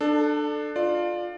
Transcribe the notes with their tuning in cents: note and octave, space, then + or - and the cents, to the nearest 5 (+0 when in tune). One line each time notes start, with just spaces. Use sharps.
D4 +25 A4 +0
F4 +10 D5 +25